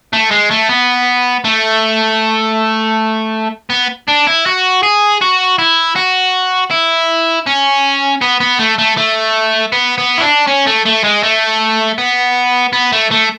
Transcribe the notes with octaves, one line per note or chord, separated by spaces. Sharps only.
A3
G#3
A3
B3
A3
B3
D4
E4
F#4
G#4
F#4
E4
F#4
E4
C#4
B3
B3
A3
A3
A3
B3
B3
E4
D4
C#4
A3
A3
G#3
A3
B3
B3
A3
A3